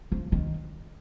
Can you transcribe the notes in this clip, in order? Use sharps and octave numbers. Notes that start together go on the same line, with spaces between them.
F3
D#3